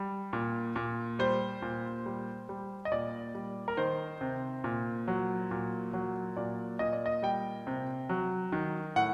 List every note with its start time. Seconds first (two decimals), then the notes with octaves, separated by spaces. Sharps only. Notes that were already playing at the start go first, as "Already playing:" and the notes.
Already playing: G3
0.33 A#2
0.76 A#2
1.19 G3 C5
1.62 A#2
2.06 G3
2.49 G3
2.85 D#5
2.92 A#2 D5
3.34 G3
3.68 A#4
3.77 D#3 C5
4.21 C3
4.64 A#2
5.08 F#3
5.51 A#2
5.93 F#3
6.37 A#2 D5
6.79 A#2 D#5
6.93 D5
7.06 D#5
7.23 G3 G5
7.67 C3
8.09 F#3
8.52 D#3
8.96 A2 F#5